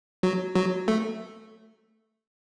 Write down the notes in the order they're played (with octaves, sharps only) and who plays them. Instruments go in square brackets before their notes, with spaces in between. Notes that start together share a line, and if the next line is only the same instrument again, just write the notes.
[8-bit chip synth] F#3
F#3
A3